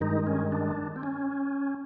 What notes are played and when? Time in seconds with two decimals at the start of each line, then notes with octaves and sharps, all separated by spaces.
0.01 G2 D#3 G#3 D#4
0.27 C#4
0.52 D4
0.96 C4
1.03 C#4